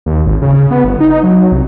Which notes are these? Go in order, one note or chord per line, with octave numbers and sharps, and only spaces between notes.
D#2
G#1
C#3
B3
G1
D#4
F#3
C2